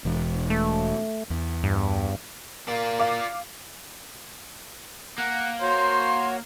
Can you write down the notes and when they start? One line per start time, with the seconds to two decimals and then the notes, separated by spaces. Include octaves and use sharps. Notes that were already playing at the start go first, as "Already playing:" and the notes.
0.05 E1 E3 G#3
0.50 A3
1.30 E2
1.64 G2
2.68 A#3 F4 D5
2.99 F5 D6
5.18 A#3 F#5
5.61 F#4 C5 C#5 C6